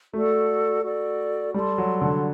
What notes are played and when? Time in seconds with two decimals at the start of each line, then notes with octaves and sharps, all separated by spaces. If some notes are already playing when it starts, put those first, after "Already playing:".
0.13 A3 F#4 A4 D5
0.84 F#4 A4 D5
1.54 G3 A4 D5 A5 C6
1.78 F#3
2.02 D3